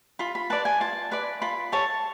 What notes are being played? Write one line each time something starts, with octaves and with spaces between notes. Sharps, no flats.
F4 B5
B5
B4 D5 A5
G#5
F4 A5
B4 D5 B5
F4 B5
A4 C#5 A5